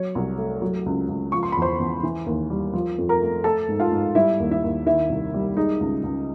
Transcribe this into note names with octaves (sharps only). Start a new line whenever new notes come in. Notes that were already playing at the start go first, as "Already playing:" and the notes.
Already playing: F#3 C#5
C2
A3
F#3
C#2
C#2
F3 C#6
C6
E2 B5
C5 C6
E2
E3
D#2
G3
F3
F2
A#4 A#5
A3
A3 A4 A5
G#2
F4 F5
G#2
G3 E4 E5
D#2
E4 E5
D#2
D#3 E4 E5
C2
G3
G#3 D#4 D#5
C#2
C#2